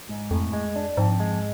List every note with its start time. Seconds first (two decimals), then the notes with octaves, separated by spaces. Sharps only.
0.09 G#2
0.31 F2 A2
0.53 G#3
0.76 D4
0.97 F2 G#2
1.20 G#3